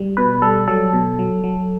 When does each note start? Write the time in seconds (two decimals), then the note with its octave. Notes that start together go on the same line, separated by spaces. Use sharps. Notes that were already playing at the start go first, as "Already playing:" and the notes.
Already playing: G3
0.17 B2 B4
0.42 G3 A4
0.68 F#3 A4
0.93 B2
1.19 F#3
1.44 F#3